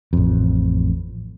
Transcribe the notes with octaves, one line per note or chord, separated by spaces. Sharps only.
A1 F2